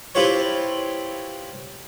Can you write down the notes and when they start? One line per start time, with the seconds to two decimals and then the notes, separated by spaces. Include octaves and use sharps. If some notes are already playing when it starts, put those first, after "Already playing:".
0.15 C4 E4 F4 G4 B4 C#5